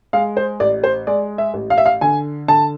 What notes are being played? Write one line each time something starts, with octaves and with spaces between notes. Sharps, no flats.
G#3 F5
C5
A1 D5
C5
G#3 D5
E5
A1
F5
E5
F5
D3 G#5
D3 A5